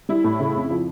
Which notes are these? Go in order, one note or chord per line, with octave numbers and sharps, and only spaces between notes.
G3 E4
A2
C#3
F2
F3